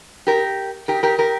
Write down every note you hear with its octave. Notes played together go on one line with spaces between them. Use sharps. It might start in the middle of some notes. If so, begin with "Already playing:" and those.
G4 A#4
G4 A#4
G4 A#4
G4 A#4